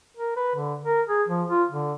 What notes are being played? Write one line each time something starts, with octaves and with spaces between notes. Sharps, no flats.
A#4
B4
D3
A#4
G#4
F3
F4
D3